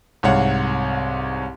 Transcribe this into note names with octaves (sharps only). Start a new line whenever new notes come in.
C2 G#2 C#5 F5 F#5